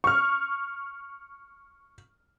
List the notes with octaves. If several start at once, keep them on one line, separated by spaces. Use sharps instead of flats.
C#6 F6